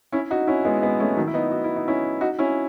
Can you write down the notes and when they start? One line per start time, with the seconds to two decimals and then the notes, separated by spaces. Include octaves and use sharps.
0.12 C#4 E4
0.31 D#4 F#4
0.47 C#4 E4
0.65 G#3 B3
0.82 G#3 B3
1.00 A3 C#4
1.16 D#3 F#3
1.27 E4
1.34 B3 D#4
1.51 F#4
1.64 E4
1.76 D#4
1.88 C#4 E4
2.21 D#4 F#4
2.39 C#4 E4